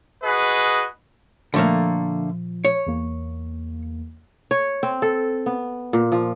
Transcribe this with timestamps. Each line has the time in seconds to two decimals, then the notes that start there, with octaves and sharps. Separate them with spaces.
0.24 F#4 G#4 B4 D#5
1.54 A#2 D3 F3 A3 A#3
2.65 C#5
2.87 E2 A#3
4.51 C#5
4.83 C4
5.02 A4
5.46 B3
5.93 A#2
6.12 F3